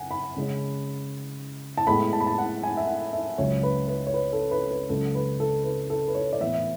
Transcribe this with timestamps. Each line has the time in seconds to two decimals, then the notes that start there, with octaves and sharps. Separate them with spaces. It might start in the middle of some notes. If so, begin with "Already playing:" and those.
Already playing: F#2 C#3 F#5 G#5
0.11 B5
0.36 C#3 G#3 C#4
1.77 A5
1.87 A2 G#3 B3 B5
2.13 A5
2.20 B5
2.27 A5
2.38 F#5
2.63 G#5
2.77 E5
2.87 F#5
3.13 E5
3.38 C#2 C#3 F#3 C#5
3.63 B4
3.88 B4
4.07 C#5
4.14 B4
4.33 A4
4.51 B4
4.71 B4
4.89 C#2 C#3 F#3 C#4 A4
5.15 B4
5.40 A4
5.64 B4
5.90 A4
6.08 B4
6.15 C#5
6.33 D5
6.40 A2 E3 B3 E5
6.54 E5